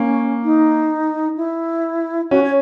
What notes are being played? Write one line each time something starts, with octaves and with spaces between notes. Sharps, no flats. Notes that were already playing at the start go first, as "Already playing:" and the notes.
Already playing: A#3 C#4
D#4
E4
C#4 F#4
C#5